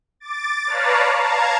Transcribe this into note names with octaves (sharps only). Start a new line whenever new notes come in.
D6 A6
B4 C#5 D5 F5 A5 A#5
F5 A5 A#5 G#6